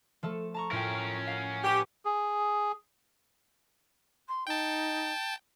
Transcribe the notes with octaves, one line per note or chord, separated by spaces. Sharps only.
F3 A3 A4
A5 A#5 C#6
A2 C#4 F4 A#4 G5
F5 F#5
G4 B4 C#6
G#4
C6
D#4 G5 A5